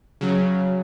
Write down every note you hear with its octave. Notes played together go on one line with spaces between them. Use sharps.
C#3 F#3